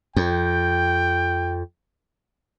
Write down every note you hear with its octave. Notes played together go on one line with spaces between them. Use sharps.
F2 G5